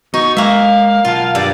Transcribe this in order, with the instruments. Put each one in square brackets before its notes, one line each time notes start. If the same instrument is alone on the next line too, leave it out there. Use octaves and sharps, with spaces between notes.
[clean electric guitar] B3 F#4 [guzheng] D#4 [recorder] C#6
[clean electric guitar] G#3 G#5 [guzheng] A#3 E5 [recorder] F5
[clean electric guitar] B1 F#5 A5 [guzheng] F4
[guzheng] G2 [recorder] D5